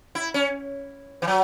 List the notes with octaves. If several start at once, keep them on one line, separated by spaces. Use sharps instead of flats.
E4
C#4
E3
F#3